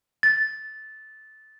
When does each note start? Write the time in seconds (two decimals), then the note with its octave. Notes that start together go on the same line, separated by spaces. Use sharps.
0.23 A6